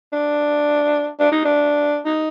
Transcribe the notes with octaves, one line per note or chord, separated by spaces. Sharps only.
D4
D4
D#4
D4
D#4